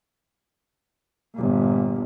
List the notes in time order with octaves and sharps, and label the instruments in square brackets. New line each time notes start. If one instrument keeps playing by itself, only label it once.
[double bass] G1 A#2